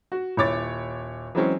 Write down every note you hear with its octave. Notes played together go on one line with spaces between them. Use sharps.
F#4
D#1 E4 C#5 D6 A6
E3 F#3 G#3 C4 C#4 G#4